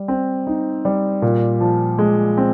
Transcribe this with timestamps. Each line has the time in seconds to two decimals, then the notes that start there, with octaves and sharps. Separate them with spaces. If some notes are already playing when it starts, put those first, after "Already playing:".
Already playing: G3
0.08 C4
0.47 D#4
0.85 G3
1.22 A#2
1.60 F3
1.99 G#3
2.37 C4